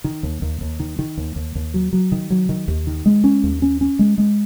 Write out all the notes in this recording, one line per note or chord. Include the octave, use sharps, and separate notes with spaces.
D#3
D#2
D#2
D#2
D#3
D#3
D#2
D#2
D#2
F#3
F#3
D#3
F#3
D#3
D#2
D#3
G#3
C#4
D#2
C#4
C#4
G#3
G#3